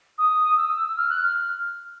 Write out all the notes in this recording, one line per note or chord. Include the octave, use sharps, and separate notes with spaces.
D#6
E6
F6
F#6
F6